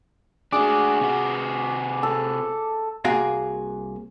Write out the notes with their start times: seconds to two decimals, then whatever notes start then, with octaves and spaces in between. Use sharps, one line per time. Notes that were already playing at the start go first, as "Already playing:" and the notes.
0.52 D4 F#4 G#4 D6
1.01 C3 F#4
2.03 A4
3.05 C2 A#3 F#4 G#4 F5